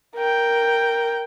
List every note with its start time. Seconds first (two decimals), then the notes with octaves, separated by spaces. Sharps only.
0.16 A#4 G5